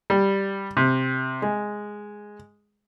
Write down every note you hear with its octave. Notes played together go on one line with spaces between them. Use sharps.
G3
C3
G#3